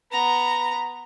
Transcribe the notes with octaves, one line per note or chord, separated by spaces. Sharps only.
B3 A#5